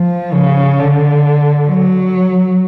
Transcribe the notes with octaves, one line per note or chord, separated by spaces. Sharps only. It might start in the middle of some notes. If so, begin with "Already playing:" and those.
Already playing: F3
C#3
D3
F#3